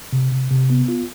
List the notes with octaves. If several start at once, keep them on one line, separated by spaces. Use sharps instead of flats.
C3
C3
C3
B3
F4